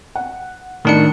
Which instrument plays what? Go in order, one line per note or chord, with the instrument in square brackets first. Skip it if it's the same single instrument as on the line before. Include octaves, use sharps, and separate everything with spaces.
[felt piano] F#5
[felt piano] A2 D#4 [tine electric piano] D#3 D4 C#7